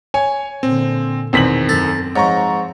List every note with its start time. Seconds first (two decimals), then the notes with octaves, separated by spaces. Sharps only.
0.14 C#5 G#5
0.63 A#2 D3 C4
1.33 E2 B2 D#3 C4 B6 F#7
1.69 F#2 A4
2.16 G#2 F3 C#5 A#5 C#6